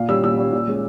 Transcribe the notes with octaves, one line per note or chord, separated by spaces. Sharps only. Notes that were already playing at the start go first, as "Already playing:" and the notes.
Already playing: A#2 F5
G3 C#4 E6
A#2 E6
G3 C#4
A#2
G#3 C#4